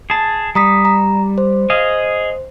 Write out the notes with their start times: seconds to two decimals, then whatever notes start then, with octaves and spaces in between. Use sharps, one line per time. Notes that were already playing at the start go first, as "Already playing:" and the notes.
0.10 G#4 A5
0.55 G3 A#5 D#6 B6
0.85 A#5
1.38 C5
1.70 G#4 D#5 F5